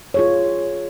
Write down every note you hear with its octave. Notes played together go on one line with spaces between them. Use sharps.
F4 G#4 C#5